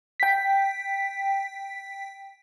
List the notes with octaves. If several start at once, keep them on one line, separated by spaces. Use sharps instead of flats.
G5 B6